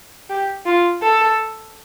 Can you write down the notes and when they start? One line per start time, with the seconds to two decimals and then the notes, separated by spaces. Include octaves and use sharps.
0.30 G4
0.66 F4
1.02 A4